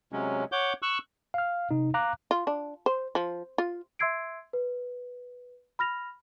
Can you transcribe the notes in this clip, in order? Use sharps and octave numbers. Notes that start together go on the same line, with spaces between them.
C3 F#3 G#3 C#4
C#5 F#5 D6 G6
C#6 E6 F#6
F5 F6
C3 D#4
F5 A#5 D6 F#6
F4
D4
C5
F3
F4
E5 C6 E6 G#6 C7 D7
B4
B5 F6 A#6 F7